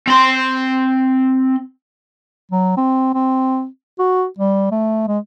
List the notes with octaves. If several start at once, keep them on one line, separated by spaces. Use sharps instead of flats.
C4 C6
F#3
C4
C4
F#4
G3
A3
G#3